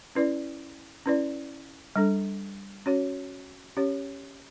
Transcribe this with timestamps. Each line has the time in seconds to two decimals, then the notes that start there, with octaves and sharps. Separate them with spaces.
0.15 C#4 E4 B4 D5
1.06 C#4 E4 B4 D5
1.96 G3 D4 A4
2.86 C#4 F#4 C#5
3.77 C#4 G4 C#5